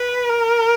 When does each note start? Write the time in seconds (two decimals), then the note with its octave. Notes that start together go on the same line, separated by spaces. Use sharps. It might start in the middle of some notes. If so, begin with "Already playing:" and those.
Already playing: B4
0.29 A#4